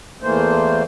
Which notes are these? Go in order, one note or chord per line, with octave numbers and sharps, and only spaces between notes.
E2 E3 A3 A#3 C5